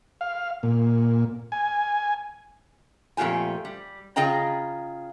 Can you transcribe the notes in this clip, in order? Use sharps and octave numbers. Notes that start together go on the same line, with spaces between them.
F5
A#2
G#5
F2 A#2 A3 F4 G4 G#5
G3
C#3 F4 G#4 D#5 G5 A#5